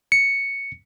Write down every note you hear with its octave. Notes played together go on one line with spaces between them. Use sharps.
C#7